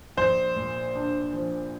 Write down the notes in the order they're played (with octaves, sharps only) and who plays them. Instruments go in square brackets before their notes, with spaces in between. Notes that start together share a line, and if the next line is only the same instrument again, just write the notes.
[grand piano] A#1 [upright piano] C5
[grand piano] A#2
D4
F3